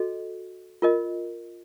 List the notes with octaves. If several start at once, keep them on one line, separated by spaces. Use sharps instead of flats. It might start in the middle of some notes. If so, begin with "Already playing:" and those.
Already playing: F#4 A4 D#5
F4 A#4 D#5